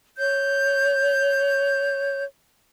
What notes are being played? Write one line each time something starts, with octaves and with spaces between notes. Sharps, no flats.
C#5 G6